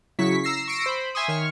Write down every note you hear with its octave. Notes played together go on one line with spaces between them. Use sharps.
C#3 F#3 E4 C#6 B6
A#5 E6 A#6 C7
C#6 E6 A#6 C7 D7
C5 B5
E5 G#5 C6 C#6 D#6
D#3 C#5 C#6 F6